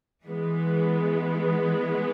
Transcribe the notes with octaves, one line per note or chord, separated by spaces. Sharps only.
E3 G#3 B3